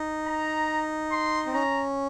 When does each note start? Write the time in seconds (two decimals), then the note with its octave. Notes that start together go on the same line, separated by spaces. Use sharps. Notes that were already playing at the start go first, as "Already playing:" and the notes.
Already playing: D#4
0.27 A#5
1.11 C6
1.46 C4
1.54 C#4 A#5